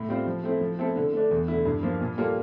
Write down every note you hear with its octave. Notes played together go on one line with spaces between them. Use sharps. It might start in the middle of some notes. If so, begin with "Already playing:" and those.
Already playing: A2
G3 C4 F4 C5
F3
A3 C4 E4
F3
A3 C4 E4 A4
D3
A3 D4
E2
D3 A3 E4
G2
F3 A#3 F4
A#2
G3 A#3 F4 A4